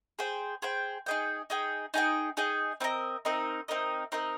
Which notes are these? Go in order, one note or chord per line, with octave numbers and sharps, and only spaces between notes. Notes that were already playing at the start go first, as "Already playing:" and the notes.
G#4 C5 G5
G#4 C5 G5
D#4 G#4 D#5 G5
D#4 G#4 D#5 G5
D#4 G#4 D#5 G5
D#4 G#4 D#5 G5
C4 D#4 A#4 D#5
C4 D#4 A#4 D#5
C4 D#4 A#4 D#5
C4 D#4 A#4 D#5